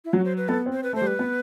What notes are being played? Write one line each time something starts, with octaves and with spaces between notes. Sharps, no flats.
E4
F#3 F#4
C5
B4
B3 A4
C4
C5
B4
A3 C5
G3
B4
B3